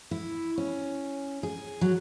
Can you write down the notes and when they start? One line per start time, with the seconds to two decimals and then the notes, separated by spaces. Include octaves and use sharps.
0.11 E4
0.58 C#4
1.43 G#4
1.81 F#3